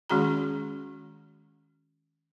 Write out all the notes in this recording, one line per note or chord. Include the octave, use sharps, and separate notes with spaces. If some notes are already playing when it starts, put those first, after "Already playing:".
D#3 G#3 C#4 F#4 G#4 A#5